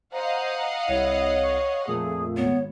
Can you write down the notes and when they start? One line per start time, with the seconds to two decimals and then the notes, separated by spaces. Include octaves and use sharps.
0.13 C5 D#5 F5 F#5 A#5
0.88 C2 E4 C#5
1.42 C#6
1.87 F2 A#2 A3 G#4
2.37 G#1 B3 C#5